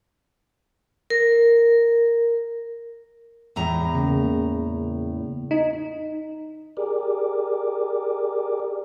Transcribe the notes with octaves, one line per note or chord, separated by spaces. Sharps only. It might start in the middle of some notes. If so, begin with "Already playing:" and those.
A#4
E2 A2 A#5
C#3 A#3
D#4
G4 G#4 A#4 D5